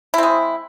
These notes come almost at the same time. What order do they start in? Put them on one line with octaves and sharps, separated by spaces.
E4 C4 G#3